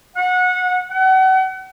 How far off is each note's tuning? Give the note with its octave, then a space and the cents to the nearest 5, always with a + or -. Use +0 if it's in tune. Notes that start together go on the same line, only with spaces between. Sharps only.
F#5 -25
F#5 +35